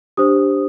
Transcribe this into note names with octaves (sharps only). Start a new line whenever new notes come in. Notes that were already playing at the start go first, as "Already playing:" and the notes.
D4 G4 C5 D#6